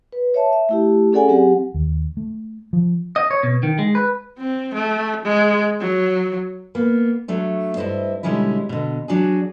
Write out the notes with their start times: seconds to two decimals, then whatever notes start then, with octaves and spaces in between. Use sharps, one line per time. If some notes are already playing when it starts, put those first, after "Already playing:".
0.12 B4
0.34 C#5 E5 A5
0.53 E5
0.69 A3 E4 G4
1.12 C#4 G#4 A4 D5 F#5 G#5
1.28 F#3 C4 G4 F#5
1.74 D#2
2.17 A3
2.73 F3
3.16 D#5
3.31 C#5
3.43 B2
3.63 D#3
3.79 G#3
3.95 B4
4.39 C4
4.74 A3
5.25 G#3
5.80 F#3
6.75 A#3 B3
7.28 F#3 A3 D4
7.76 G2 E4 C5 D#5 F5
8.23 B2 D3 G3 G#3 C#4 E4
8.69 B2 D3
9.08 F#3 D4 F#4 G#4